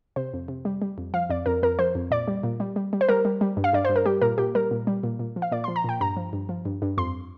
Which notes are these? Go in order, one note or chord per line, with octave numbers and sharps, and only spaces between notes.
C3 C5
F2
C3
G3
G3
F2
F3 F5
F2 D5
F2 A#4
F2 A#4
F3 C5
F2
A#2 D5
G3
A#2
G3
G3
G3
C5
G3 A#4
G3
G3
G2
F5
G2 D5
G2 C5
A#4
G3 G4
A#2 A#4
A#2 G4
G3 A#4
A#2
G3
A#2
A#2
F3
F5
A#2 D5
C6
F3
A#5
A#2 G5
G2 A#5
F3
G2
F3
G2
G2
F2 C6